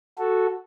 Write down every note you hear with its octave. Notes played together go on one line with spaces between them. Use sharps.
F#4 A4